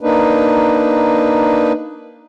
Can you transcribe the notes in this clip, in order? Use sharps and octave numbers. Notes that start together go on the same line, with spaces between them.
A#3 D4 D#4 B4